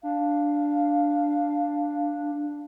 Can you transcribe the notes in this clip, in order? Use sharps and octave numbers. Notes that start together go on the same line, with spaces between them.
D4 F5